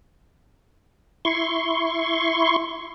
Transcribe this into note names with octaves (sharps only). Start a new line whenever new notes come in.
E4 C6 C#6